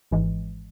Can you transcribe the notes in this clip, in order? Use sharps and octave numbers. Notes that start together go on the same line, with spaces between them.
G#1 G#2 E3 G#3